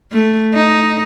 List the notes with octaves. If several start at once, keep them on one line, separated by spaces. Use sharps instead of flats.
A3
D#4